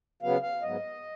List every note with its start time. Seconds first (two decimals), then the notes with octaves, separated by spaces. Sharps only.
0.22 C#3 F#3 B3 F5
0.42 F5
0.63 G#2 F#3 B3 D#5